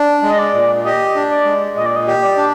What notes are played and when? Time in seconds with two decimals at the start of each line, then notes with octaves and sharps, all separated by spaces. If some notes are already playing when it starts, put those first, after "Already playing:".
Already playing: D4
0.23 G#3
0.28 D#5
0.39 D5
0.53 A#2
0.84 G4 D#5
1.16 D4
1.30 D5
1.45 G#3
1.76 A#2 D#5
1.86 D5
1.96 D#5
2.07 G4
2.22 D5
2.37 D4